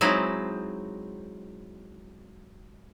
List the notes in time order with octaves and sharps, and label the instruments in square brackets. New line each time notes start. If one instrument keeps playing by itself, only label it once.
[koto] F#3 G#3 C4 D#4 E4